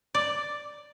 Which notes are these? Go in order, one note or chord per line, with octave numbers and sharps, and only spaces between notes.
D5